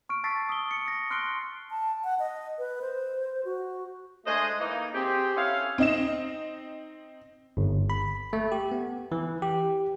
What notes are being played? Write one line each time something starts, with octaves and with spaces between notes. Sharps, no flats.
C#6 F6 D7
A5 E6 A6 B6 C7 D7
D#6 G7
C#7
D#6 A#6
C6 F6 F#6 C7 D7 G7
A5
F#5
D#5
B4
C5
F#4
G#3 A3 D4 C5 D#5 G#5
E3 A#3 D#4
C4 G4 G#4
C#4 E4 A4 F5
C4 D#4 D#5 E7
G1
B5
A3
G4
B3
E3
G4